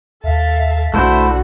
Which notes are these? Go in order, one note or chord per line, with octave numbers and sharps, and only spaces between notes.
D#2 A4 E5 F5 A5
B1 D3 A3 E4 F#4 C5